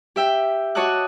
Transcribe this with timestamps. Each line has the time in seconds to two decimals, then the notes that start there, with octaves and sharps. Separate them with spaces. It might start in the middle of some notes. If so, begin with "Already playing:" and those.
0.16 G4 E5 G5
0.75 F#4 C#5 D#5 A5 D6 F#6